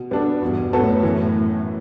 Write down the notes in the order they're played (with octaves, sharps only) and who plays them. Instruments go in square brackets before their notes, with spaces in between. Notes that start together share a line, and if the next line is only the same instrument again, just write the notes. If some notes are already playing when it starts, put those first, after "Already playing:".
Already playing: [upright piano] B2
G3 B3 D4 A4
[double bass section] E2 G2 [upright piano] B2
[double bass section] F#2 A2 [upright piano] F#3 B3 F#4 A4
[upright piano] E3